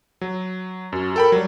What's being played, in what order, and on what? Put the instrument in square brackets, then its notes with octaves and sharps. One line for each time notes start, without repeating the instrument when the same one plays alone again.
[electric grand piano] F#3
[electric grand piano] F#2 [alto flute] F#4
[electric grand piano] A4 G5 B5 [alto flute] A#4
[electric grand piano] F#3 G3